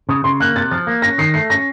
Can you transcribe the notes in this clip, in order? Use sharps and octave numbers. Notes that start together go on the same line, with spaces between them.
C#3 D#6
C#3 C6
A#3 F#6
C3 A6
F3 A6
A#3
C#4 A#6
D#3 C7
A3 C7
C#4 A#6